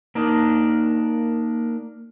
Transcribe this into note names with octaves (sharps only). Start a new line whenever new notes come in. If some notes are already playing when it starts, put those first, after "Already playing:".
A#3 D4 D#4 A#4